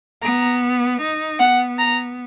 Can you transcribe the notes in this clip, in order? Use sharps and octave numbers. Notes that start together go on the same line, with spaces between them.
B3 A#5
D#4
B3 F#5
A#5